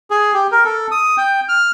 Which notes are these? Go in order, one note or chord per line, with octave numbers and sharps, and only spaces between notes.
G#4
G4
A#4
A4
D#6
G5
F6